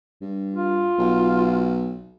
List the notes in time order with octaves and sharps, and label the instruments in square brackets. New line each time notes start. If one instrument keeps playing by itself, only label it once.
[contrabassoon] G2
[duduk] F4
[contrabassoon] B1